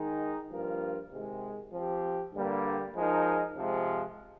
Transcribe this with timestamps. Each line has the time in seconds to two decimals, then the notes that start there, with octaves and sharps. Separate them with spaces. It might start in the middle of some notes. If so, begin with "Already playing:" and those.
Already playing: D#3 G#3 D#4
0.50 G2 F3 A#3 F4 A#4
1.11 C3 D#3 G#3
1.73 F3 C4 G4
2.33 G2 D3 G3 A#3
2.95 F3 G#3 D#4 A#4
3.56 C3 F3 G#3